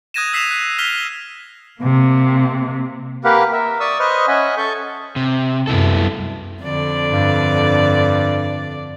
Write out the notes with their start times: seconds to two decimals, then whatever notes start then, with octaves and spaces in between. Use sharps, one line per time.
0.14 D#6 F#6 G#6 A#6 D#7 E7
0.33 E6 B6 C7 E7 F7
0.51 F#6
0.78 F6 B6 F7 G7
1.81 C3 A#3
3.24 A#3 G4 A#4 B4 F5 F#5
3.52 A#4 E5
3.80 D5 C#6 D#6 E6
3.99 B4 C5 D#5 C#6 D#6 F6
4.28 C#4 D#5 E5 F#5 G#5
4.57 A4 C#6 G6
5.16 C3
5.67 C2 F#2 B3 E4 A4
6.60 F2 D3 D5
7.12 G2